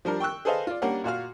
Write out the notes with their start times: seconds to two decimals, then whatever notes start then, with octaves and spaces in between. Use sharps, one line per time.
0.05 F3 G3 D4 A#4
0.20 G5 C#6 E6 F#6
0.45 G#4 A4 B4 C5 D#5 F5
0.67 F4 D5
0.82 G3 A#3 C#4 D4 G4 F#5
1.04 A#2 F#4 F5 F6